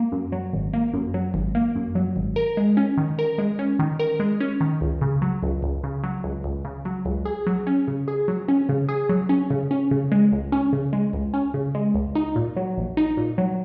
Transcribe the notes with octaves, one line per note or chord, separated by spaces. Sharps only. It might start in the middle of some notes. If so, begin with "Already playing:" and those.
Already playing: A#3
F#2
F#3
G#1
A#3
F#2
F#3
G#1
A#3
F#2
F#3
G#1
A#4
G#3
C#4
D#3
A#4
G#3
C#4
D#3
A#4
G#3
C#4
D#3
C#2
C#3
F#3
C#2
C#2
C#3
F#3
C#2
C#2
C#3
F#3
C#2
G#4
F#3
C#4
C#3
G#4
F#3
C#4
C#3
G#4
F#3
C#4
C#3
C#4
C#3
G#3
C#2
C#4
C#3
G#3
C#2
C#4
C#3
G#3
C#2
D#4
A#2
F#3
A#1
D#4
A#2
F#3